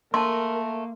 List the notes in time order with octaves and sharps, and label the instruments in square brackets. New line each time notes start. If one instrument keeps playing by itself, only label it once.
[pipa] A3 [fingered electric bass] A#3 [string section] A#4 [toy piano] A5 C6